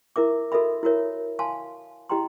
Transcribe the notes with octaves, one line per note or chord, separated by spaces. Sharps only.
E4 A#4 E5 D6
F#4 A4 A#4 D#5 E5 B5
E4 F#4 A#4 C#5 E5
F5 G#5 A5 C6
E4 G4 D#5 G5 A#5 C6